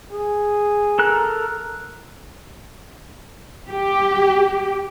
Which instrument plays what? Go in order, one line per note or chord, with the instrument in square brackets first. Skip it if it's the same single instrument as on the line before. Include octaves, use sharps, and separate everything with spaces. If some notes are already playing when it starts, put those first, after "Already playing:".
[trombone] G#4
[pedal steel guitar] A4 A#4 F#6
[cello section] G4